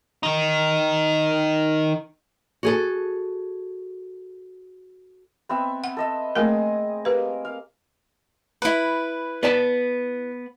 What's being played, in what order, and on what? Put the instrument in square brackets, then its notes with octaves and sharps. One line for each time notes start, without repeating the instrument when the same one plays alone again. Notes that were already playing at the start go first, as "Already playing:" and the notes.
[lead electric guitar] D#3 D#4
[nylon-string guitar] F#4 G#4 A4
[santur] B3 C4 E5
[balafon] F#5
[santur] A4 D#5 E5
[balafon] A3 A#3 A#4 [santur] C4 G#4 D#5
[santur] A#3 [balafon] G4 B4
[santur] F5
[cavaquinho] E4 B4
[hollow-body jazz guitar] B3 D5 A5